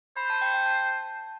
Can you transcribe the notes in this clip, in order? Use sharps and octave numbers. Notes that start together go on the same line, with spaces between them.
C5 B5
A5
G5
G5
A5